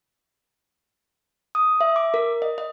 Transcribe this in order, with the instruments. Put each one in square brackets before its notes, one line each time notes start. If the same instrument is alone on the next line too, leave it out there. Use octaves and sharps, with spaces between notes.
[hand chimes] D#6
E5
D6
A#4
D#5
D#5